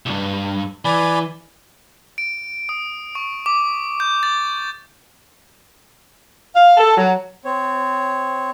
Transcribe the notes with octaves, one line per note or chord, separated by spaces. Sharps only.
C2 G2
E3 D5 G#5 B5
D7
D#6
C#6
D6
G6
A6
F5
A4
F#3
C4 C#5